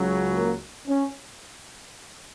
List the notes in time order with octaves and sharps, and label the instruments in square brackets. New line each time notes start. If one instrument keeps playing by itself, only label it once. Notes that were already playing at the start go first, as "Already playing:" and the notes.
Already playing: [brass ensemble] C#2 C#3 F#3
[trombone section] A#3
C#4